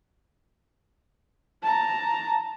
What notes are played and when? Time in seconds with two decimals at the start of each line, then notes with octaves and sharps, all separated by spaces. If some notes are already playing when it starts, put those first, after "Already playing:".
1.63 A5 A#5